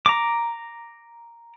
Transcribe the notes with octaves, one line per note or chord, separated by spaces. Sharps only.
A#5 D6